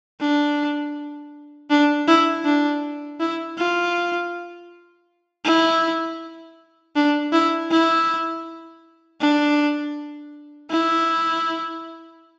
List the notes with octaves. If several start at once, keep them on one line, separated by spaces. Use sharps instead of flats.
D4
D4
E4
D4
E4
F4
E4
D4
E4
E4
D4
E4